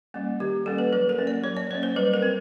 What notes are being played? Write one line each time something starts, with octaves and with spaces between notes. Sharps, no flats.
G3 A#3 C#4
D#3 G4
G3 A#3 C#4 A4
B4
F#3 B4
A#4
A#3 C#4
D5
F#3 C#5
D5
A#3 C#4 C#5
C5
G3 B4
A#4
C4